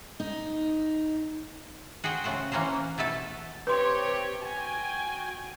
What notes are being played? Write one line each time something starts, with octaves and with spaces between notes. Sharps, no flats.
D#4
F#4 G#4 C5 G5
C#3 A3 F#4 C5
E3 A#3 C#4 A#4 C5
B2 A3 E4 A4
C3 G4 B4 C#5 C6
F#4 G5 G#5